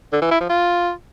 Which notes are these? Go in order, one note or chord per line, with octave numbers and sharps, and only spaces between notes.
D3
E3
E4
F3
F4